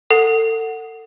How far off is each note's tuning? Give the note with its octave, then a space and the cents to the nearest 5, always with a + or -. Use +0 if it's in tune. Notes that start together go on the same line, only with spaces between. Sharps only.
A4 +30 F#5 +0